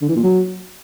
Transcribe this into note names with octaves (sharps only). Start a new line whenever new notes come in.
D3
E3
A#2
F#3